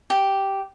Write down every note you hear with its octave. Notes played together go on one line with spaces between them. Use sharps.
G4